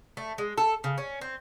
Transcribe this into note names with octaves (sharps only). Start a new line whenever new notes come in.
A3
G#3
A4
C#3
C#4
C4